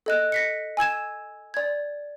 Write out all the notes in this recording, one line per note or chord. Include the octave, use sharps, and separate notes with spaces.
A4 D#5 F#6
A#6 B6 C#7
G#5 E6 G#6 E7
D5 G#6